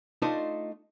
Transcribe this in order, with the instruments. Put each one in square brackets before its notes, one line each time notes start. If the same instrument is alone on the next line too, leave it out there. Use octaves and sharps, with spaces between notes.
[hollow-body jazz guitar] A3 D4 D#4 F4 C5 D#5